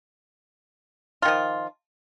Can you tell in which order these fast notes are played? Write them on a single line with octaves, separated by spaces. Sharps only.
F4 D#3 F3